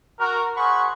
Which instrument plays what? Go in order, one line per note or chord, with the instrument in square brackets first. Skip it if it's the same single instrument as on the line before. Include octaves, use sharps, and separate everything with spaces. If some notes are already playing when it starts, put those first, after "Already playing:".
[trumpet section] F#4 A#4
F#4 G#4 C5 F#5 B5 C#6